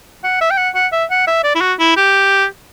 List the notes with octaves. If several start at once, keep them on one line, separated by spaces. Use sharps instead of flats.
F#5
E5
G5
F#5
F#5
E5
F#5
E5
D5
E4
F#4
E4
G4